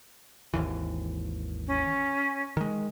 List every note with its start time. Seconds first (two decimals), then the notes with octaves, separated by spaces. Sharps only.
0.54 G#1 D#2 E3
1.67 C#4
2.57 D#3 G#3